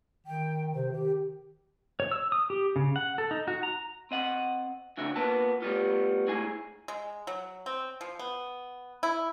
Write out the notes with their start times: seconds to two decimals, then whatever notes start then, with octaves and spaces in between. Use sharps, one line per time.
0.27 D#3 G5
0.75 C3 C5
0.92 D#3 G4
2.00 C#5
2.11 E6
2.32 D#6
2.50 G4
2.76 C#3
2.96 F#5
3.18 A4
3.31 D#4
3.48 F#4
3.63 A#5
4.11 C4 D#5 F#5
4.97 A2 C#3 D4 F#4 E5
5.16 A#3 B3 F4 B4 A5
5.62 G3 A3 B3 F4
6.27 G#2 A3 E4 G#4 G#5
6.88 G#3
7.27 F#3
7.66 C4
8.01 F3
8.19 B3
9.03 E4